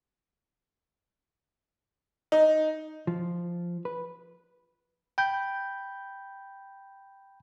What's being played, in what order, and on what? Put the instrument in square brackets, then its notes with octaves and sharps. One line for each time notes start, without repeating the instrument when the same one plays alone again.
[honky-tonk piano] D#4
[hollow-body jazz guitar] F3
B4
[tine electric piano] G5 B5 G6